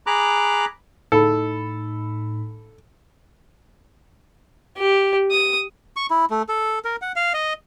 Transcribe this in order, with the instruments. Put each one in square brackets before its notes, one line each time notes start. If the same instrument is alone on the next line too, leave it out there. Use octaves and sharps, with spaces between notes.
[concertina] G#4 A#5 B5 D6 F#6
[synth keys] A2 D#4 B5 [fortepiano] A4
[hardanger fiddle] G4
D#6
[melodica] C#6
E4
A3
A4
A#4
F#5
F5
D#5